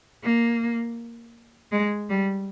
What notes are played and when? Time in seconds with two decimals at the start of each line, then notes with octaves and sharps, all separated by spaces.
0.23 A#3
1.72 G#3
2.09 G3